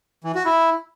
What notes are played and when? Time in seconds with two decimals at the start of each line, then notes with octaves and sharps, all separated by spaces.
0.24 E3
0.35 F#4
0.46 E4